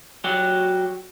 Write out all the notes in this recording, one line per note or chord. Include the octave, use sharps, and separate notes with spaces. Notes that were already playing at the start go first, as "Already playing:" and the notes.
F#3 F#4 G4